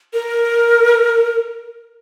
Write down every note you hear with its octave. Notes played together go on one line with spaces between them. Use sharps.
A#4